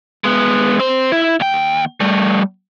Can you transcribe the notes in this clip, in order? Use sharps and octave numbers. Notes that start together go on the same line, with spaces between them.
G#3 B3
C4 C5
E4
D#2 G5
G3 A3